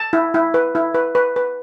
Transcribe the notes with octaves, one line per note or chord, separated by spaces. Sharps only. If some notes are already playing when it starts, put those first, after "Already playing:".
Already playing: A5
E4
E4
B4
E4
B4
B4
B4